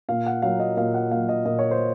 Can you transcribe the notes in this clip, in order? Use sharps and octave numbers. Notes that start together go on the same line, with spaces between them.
A#2 F5
F#5
F#3 A#3 F5
D#5
A#2 F5
F#5
F#3 A#3 F5
D#5
A#2 D#5
C#5
C5